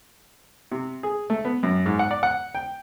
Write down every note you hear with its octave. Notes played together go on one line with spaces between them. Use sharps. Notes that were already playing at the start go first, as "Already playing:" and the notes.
C3
G#4
A3
B3
F#2
G#2
F#5
D5
F#5
G5